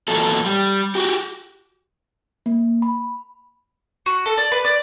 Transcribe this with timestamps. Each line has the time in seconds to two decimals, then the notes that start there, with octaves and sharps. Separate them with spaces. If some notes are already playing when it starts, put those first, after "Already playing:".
0.08 E2 A#2 F#3 A4
0.46 G3
0.95 F#4 G4
2.46 A#3
2.82 B5
4.06 F#4
4.26 A4
4.37 D5
4.52 B4
4.65 D5